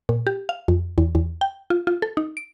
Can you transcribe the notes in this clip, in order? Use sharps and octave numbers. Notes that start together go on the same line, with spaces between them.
A#2
G4
F5
F2
E2
E2
G5
F4
F4
A4
D#4
D7